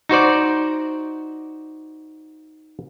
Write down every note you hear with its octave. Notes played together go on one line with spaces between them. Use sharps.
D#4 F#4 C5 D5